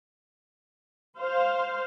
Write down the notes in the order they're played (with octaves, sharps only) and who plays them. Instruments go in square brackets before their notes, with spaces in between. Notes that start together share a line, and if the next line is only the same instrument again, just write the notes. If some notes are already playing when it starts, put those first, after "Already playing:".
[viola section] C5 F5